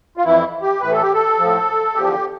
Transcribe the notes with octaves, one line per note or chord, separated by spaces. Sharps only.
F4
F2 E3 E4
G4
A2 E3 B4
A4
G4
A4
A2 F3
E2 D3 F3 G4